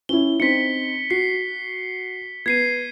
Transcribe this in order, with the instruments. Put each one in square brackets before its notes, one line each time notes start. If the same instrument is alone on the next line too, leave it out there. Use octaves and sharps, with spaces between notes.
[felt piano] C#4 E4 [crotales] G7
[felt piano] C4 D#4 [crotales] B6 C#7
[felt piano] F#4 [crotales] C7
[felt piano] B3 [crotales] G#6 C7 D#7